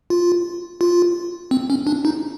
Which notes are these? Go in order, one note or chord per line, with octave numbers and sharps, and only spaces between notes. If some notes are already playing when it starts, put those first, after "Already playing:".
F4
F4
C4
C#4
D4
D#4